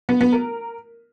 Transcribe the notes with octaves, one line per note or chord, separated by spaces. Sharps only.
B3
B3
A#4